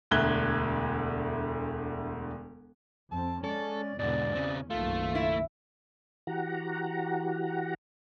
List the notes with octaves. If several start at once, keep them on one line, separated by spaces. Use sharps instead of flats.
E1 D2 E5 F#6 G#6 G7
F2 C4 A5
G#3 C#4 A4 D5
E2 G#2 B2 D3 D5
C#3 C4 C#4
F#1 B1 D#3 A3 F4
E4
E3 F#4 G4 F#5 A#5